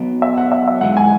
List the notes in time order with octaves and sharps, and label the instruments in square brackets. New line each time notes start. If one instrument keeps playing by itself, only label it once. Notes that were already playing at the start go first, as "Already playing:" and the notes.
Already playing: [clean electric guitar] B1 B2 F#3
[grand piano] E5
F#5
E5
E5
[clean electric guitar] G#2 E3 G#3 [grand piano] F#5
[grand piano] G#5